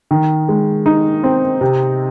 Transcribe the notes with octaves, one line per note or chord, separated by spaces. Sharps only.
D#3
G#3
D#4
C4
C3